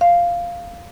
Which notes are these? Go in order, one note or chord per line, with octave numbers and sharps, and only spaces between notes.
F5